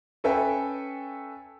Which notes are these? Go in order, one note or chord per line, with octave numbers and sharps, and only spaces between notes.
C#4 A4 B4 E5 G5 G#5